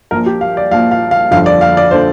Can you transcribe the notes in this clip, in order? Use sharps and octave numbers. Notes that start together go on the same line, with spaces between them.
A#1 A#2 F3 A#4
G4
F5
D5
A#1 A#2 F3 F5
F5
F5
G1 F2 D3 F3 F5
D5
F5
D5
D3 F3 C5